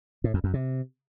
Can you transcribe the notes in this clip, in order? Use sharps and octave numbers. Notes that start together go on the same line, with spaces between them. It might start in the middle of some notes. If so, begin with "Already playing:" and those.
A2
F2
F#2
C3